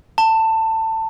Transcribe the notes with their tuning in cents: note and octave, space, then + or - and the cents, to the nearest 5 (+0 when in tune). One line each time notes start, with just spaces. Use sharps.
A5 +20